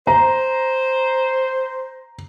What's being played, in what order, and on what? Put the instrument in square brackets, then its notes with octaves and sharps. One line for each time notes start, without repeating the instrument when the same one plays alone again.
[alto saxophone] C5 [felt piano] A#5